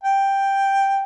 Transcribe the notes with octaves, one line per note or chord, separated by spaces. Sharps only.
G5